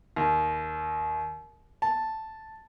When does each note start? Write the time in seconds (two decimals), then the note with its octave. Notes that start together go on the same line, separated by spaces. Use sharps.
0.16 D#2
1.82 A5